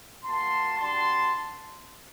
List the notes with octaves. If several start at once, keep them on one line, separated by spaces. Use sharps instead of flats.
A#3 F#4 A5 C6
G3 D4 F#4 A5 C6